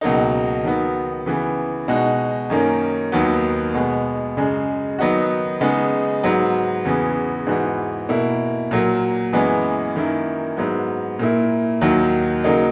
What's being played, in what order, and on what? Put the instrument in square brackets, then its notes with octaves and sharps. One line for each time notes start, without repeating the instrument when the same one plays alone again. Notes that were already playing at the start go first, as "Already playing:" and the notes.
[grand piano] C#2 B2 F#3 A#3 D#4
D#3 F#3 B3
C#3 E3 B3
B2 G#3 D#4 F#4
F#2 D#3 A#3 C#4
D#2 D#3 F#3 B3
B2 G#3 B3
F#2 C#3 G#3
D#3 F#3 B3 D#4 F#4
C#3 G#3 B3 D#4
G#2 F#3 B3
E2 C#3 E3 B3
G#2 E3 B3 F#4
B2 A#3 E4
A#2 F#3 A#3
F#2 E3 G#3 B3
F#2 D#3 A#3 E4
G#2 F#3 B3
A#2 A#3 E4
D#2 D#3 F#3
C#3 F#3 A#3 D#4